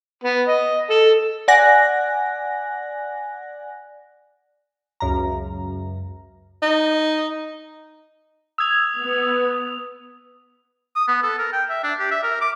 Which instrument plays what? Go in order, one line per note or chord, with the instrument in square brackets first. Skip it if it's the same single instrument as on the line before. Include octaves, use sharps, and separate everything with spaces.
[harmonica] B3
D#5
A4
[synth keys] D5 F#5 G#5 F#6 A#6
C#2 F#2 A#5
[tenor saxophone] D#4
[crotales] D#6 F7 [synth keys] E6 G#6
[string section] B3
[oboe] D#6
B3
A4
A#4
G5
E5
D4
G4
E5
A#4
D6